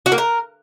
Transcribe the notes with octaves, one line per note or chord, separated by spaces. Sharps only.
F#4
A#3
A#4